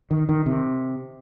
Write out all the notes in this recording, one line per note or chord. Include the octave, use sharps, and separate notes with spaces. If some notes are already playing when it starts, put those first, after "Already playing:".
D#3
D#3
C3